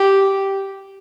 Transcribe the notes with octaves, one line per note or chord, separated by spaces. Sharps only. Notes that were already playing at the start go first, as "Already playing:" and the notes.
Already playing: G4